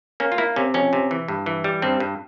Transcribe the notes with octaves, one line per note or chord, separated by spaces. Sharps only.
A#3 C#4
F4
A#3 E4
C3 C#4
F2 C#4
C3
E3
G2
E3
G3
G2 C4
G2